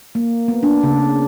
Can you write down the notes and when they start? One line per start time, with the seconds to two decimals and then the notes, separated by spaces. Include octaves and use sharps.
0.15 A#3
0.48 B3
0.63 D4
0.83 C#3